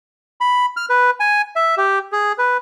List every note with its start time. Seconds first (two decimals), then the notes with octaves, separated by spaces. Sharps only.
0.41 B5
0.77 F6
0.90 B4
1.20 G#5
1.56 E5
1.77 G4
2.12 G#4
2.38 B4